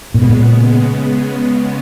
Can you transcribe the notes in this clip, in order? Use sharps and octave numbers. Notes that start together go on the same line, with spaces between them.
A#2 C#3 G#3 B3
B2
A#2